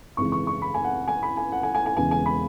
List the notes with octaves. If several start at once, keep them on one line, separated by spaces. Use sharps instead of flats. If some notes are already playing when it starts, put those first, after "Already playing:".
G#1 F#2 C#3 E3 G#3 C#6
C#6
C#6
B5
G#5
F#5
G#5
B5
G#5
F#5
G#5
G#5
G#5
E1 E2 C#3 E3 G#3 G#5
G#5
B5